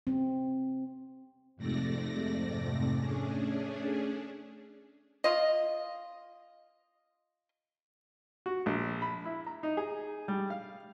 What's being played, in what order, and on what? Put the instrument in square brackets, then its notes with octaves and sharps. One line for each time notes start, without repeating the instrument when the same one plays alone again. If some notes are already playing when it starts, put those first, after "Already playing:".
[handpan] C4
[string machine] F2 G#2 C3 A3 D5 A#6
A3 C#4 D4 G#4
[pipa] F4 D#5
[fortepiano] F#4
A#1
B5
E4
A#5
D#4
G#4
G3
F5